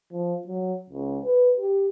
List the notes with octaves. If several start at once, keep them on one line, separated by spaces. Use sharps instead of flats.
F3
F#3
C#2
B4
G4